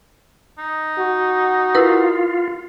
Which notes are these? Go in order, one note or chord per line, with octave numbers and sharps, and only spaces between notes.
D#4
F#4
E4 F4 A#4 B4